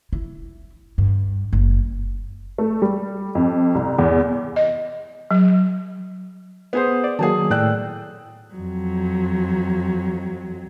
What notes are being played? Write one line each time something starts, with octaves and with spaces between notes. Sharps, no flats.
E4
G2
F#1
A3
G3
F2
C2
E2
D#5
F#3
B3 G#4 C5
D5
D#3 F#3 A#3 G#4 G#5 A5
A2 D5 G5 E6 F#6
F2 F#3